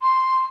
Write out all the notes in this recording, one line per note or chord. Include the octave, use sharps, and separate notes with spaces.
C6